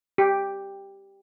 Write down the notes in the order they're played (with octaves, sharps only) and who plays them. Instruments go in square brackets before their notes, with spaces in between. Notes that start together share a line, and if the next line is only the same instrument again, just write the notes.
[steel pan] G4